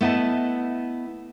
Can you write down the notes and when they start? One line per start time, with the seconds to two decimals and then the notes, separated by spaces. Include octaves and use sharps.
0.01 A3 B3 E4 D#5 A5